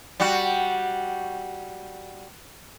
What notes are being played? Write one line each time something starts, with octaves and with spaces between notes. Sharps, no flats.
G3 F#4